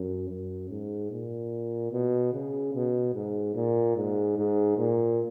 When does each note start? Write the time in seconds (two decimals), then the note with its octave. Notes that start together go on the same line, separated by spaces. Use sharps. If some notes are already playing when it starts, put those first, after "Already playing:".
Already playing: F#2
0.30 F#2
0.70 G#2
1.11 A#2
1.92 B2
2.33 C#3
2.74 B2
3.15 G#2
3.55 A#2
3.97 G#2
4.37 G#2
4.78 A#2